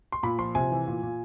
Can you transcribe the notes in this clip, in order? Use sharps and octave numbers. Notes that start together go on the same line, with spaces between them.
C6
A#2 B5
F3 C6
C3 G#5
E3
A#2
A#2